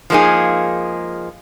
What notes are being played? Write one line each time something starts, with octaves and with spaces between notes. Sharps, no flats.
F3 G#3 A#3 D#4 G#4